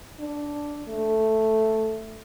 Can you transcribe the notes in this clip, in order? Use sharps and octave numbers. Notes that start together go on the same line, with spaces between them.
D4
A3